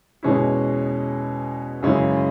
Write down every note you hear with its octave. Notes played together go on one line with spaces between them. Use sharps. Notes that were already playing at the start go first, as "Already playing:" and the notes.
E2 B2 G#3 C#4 E4
F#2 C#3 G#3 C#4 E4